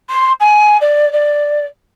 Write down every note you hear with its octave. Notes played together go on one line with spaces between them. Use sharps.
C6
G#5
D5
D5